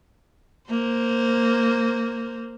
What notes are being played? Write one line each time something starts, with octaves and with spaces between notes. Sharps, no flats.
A#3 C5